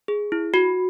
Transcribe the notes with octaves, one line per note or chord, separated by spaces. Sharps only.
G#4
E4
F#4